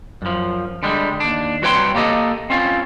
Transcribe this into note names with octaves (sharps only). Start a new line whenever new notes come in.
F#2 F3
D3 G3 G#3
D#2 D4
C2 F#4 B4 C#5 G5 C6
A#3 G4 A4 D#5
C4 C#4 F4